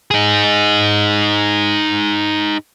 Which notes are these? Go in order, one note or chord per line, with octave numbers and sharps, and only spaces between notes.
D#4 G#4